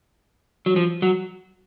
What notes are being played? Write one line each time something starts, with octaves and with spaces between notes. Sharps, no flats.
F#3
F3
F#3